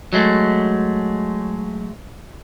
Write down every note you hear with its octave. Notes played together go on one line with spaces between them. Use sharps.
F#3 G#3 A3